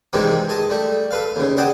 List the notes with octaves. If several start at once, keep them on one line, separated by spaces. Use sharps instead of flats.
C3 D#3 E3 G3 G#3 A#3
G#4 D#5 A5
G3 A3
A4 B4 F5
D#2 C#3
G#4 D5 D#5 F#5 G5 A5